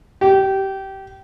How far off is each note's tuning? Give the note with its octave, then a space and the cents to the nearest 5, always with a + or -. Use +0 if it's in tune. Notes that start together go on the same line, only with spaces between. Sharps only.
G4 -20